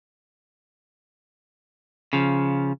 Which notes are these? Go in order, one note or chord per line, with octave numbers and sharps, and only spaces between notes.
C#3 F3